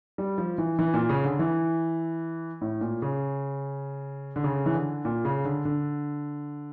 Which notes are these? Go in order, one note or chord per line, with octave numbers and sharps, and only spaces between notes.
G3
F3
E3
E3
A#2
C#3
D3
E3
A2
A#2
C#3
D3
C#3
E3
D3
A#2
C#3
D3
D3